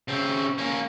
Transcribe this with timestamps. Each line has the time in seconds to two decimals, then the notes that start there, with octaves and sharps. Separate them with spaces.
0.08 C#3 C4
0.58 A#3 C#4